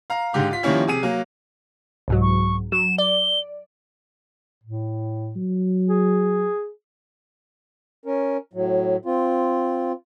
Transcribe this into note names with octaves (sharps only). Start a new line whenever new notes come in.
F5 A#5
G#2 D3 G4 F5
F4 B6
D#3 F3 G3 A#3 C#4 E4
C3 G#4 D#7
F#3 A#3
C2 G#2 F#3
C#6
F#3 E7
D5 G7
A2
F#3
G#4
C#4 A#4
A2 F#3
C4 F4